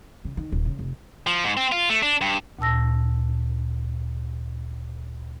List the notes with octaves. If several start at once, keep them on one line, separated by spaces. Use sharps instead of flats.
C#3
D#3
D#1
C#3
F1
F3
G#2
C4
F4
A3
D4
G2
D2 A#2 A5 E6 A#6